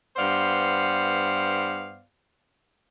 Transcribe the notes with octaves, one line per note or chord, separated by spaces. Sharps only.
G2 B3 C5 D5 F5